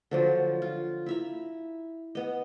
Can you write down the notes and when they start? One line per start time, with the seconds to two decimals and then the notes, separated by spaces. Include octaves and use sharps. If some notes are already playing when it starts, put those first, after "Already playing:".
0.11 D3 F3 F#3
0.62 F4
1.06 E4 E5 A#5
2.15 B3 D#5